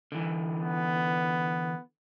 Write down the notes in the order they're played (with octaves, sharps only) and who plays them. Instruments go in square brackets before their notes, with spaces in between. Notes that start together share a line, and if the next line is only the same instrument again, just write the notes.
[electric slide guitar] D3 E3
[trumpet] B3